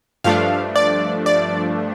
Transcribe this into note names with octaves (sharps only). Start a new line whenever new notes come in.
G2 F3 A3 D4 F5
D5
D5